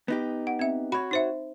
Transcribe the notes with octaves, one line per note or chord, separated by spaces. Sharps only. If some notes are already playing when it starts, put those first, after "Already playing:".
B3 D#4 G4
F#5
C4 E5
F#4 C#5 B5
D#4 C5 E5